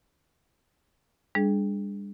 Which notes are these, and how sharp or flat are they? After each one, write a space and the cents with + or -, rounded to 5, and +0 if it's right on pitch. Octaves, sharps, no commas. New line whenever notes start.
G3 +40 D4 +0 G#4 +25